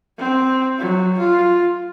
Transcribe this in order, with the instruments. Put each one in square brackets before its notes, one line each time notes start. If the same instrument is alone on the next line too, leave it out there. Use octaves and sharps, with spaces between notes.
[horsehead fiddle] C4
F#3
F4